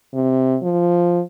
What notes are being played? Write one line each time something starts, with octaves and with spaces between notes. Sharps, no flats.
C3
F3